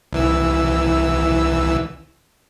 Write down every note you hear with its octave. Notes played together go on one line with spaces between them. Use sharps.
C2 E3 E6